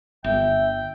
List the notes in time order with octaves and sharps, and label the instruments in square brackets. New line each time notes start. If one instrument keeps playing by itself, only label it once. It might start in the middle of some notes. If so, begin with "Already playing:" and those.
[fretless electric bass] G1 [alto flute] E5 [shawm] G5